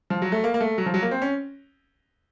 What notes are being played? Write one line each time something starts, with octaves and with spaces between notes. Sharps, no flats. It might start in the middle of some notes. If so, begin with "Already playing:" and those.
F3
F#3
A3
A#3
A#3
A3
F#3
F3
F#3
A#3
C4
C#4